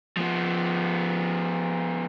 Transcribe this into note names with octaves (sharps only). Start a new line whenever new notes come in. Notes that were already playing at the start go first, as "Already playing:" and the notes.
F3 B3